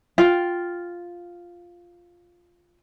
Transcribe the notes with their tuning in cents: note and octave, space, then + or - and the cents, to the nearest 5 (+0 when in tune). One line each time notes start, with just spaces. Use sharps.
F4 +0 G5 +0